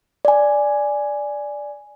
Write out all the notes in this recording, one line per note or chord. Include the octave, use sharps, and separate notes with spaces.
D5 G#5